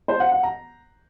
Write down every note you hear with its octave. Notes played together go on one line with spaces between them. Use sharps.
C5
F#5
F#5
A#5